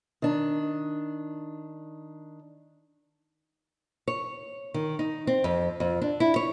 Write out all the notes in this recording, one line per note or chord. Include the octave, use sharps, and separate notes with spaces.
D#3 D4
C#5
D#3
D#4
C4
F2
F2
D4
E4
C#5